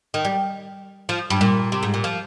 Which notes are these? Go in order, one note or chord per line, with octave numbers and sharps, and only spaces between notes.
D#3
G3
F3
G2
A#2
C3
G#2
A#2
F3